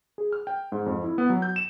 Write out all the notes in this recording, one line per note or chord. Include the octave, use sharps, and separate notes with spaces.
G#4
F6
G5
G#2
F2
E4
B3
F#3
G6
E7